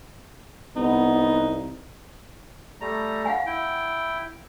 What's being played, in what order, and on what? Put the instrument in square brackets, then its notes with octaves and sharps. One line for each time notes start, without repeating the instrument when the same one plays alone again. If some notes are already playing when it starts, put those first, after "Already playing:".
[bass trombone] C2 [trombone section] B3 [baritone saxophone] D#4
[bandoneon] G3 A3 A#5
[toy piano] F5 F#5 G#5
[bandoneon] E4 G5